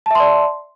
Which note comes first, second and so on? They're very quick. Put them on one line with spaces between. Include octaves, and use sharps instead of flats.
A5 E5 C6 D5